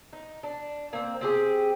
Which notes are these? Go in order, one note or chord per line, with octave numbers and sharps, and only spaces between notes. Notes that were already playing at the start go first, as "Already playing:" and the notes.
D#4
D4
A#3 C4
C4 G4 G#4